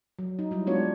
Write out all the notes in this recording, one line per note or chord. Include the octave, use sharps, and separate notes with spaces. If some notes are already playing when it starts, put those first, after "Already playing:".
F#3
D#4
F#3 G3 E4
G#3 B3 D4 F4 F#4 C#5